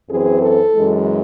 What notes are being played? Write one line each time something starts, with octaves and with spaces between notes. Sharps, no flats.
F#2 E3 C4 G#4
A4
F#2 E3 G#3